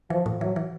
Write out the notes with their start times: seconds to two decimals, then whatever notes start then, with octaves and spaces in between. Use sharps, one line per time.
0.10 E3 F3
0.26 A2
0.41 E3 F#3
0.56 E3